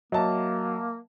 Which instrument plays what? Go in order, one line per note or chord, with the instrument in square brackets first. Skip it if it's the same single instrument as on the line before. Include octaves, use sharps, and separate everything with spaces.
[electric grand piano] F#3 [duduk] A#3 [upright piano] D#5 E5 A5